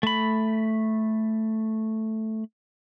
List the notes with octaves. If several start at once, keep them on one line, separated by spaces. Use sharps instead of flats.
A3 B5